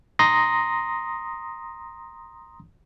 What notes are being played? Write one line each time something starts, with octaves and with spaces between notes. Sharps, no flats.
A#5 C6 D#6 A#6